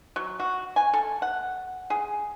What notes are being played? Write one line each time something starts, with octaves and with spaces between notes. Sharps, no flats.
F#3
F#4
G#5
A4
F#5
G#4